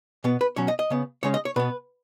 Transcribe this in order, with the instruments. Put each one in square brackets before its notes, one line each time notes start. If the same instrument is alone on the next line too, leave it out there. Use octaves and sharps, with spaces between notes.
[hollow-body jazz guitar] B2 B3
B4
B2 F#3 C#4 C#5
D#5
D#5
C#3 B3
C#3 G#3 C#4 C#5
D#5
C#5
B2 B3 B4